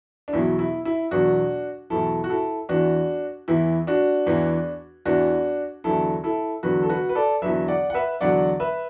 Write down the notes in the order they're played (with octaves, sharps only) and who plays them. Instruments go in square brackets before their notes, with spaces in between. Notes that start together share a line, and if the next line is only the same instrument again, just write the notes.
[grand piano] D4
E2 B2 F#3 E4
E4
E4
E2 B2 F#3 D4 F#4
E2 B2 F#3 E4 A4
F#4
E4 A4
E2 E3 D4 F#4
E2 E3 E4
D4 F#4
E2 E3
E2 E3 D4 F#4
E2 D3 F#3 E4 A4
E4 A4
E2 D3 F#3 F#4 B4
A4
F#4 B4
B4
A4 D5
E2 D3 F#3 B4 E5
D5 F#5
F#5
B4 E5
E2 D3 F#3 D5 F#5
B4 E5